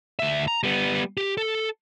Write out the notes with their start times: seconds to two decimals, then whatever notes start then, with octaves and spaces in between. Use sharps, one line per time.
0.19 D2 E5
0.48 A#5
0.63 G3 B3
1.17 G4
1.37 A4